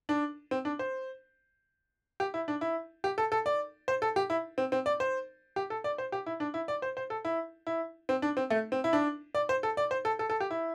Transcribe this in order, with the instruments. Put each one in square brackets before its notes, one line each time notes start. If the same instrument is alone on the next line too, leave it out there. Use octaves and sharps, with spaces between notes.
[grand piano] D4
C4
D4
C5
G4
E4
D4
E4
G4
A4
A4
D5
C5
A4
G4
E4
C4
C4
D5
C5
G4
A4
D5
C5
G4
E4
D4
E4
D5
C5
C5
A4
E4
E4
C4
D4
C4
A3
C4
E4
D4
D5
C5
A4
D5
C5
A4
A4
A4
G4
E4